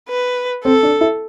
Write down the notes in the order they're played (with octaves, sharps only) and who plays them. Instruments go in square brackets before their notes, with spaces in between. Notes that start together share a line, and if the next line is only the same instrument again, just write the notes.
[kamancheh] B4
[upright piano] C4 [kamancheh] A4
[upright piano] D4
E4